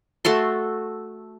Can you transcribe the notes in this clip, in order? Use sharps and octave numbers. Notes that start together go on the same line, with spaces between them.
A3 F#4 A4 C6